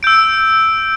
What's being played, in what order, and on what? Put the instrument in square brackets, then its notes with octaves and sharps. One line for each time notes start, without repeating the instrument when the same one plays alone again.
[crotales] E6 G6 D7